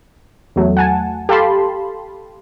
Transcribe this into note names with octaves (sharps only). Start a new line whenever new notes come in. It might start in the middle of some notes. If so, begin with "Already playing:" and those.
E2 F#3 A3
F#5 G#5 A5
G4 A4 F5 A5 B5 C6